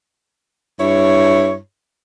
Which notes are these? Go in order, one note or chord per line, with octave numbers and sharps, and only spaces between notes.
G2 E4 C#5